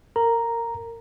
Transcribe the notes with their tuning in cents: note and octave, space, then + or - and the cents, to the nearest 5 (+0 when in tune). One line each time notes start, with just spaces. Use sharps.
A#4 -20 A#5 +0